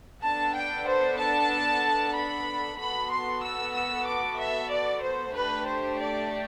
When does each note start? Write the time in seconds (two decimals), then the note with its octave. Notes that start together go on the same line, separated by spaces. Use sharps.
0.22 B3 D4 A4 A5
0.54 G5
0.87 C5
1.19 A5
2.15 B5
2.78 B3 F#4 A4 B5
3.10 C6
3.42 E6
3.73 E6
4.05 D6
4.38 E5
4.70 D5
5.02 C5
5.33 A3 D4 G4 B4
5.66 C5
5.97 D5